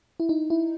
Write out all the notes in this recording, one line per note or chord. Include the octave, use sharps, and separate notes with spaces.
E4
D#4
E4